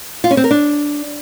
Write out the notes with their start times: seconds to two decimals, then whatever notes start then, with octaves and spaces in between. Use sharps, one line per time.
0.24 F4
0.31 C#4
0.37 C4
0.44 A#4
0.51 D4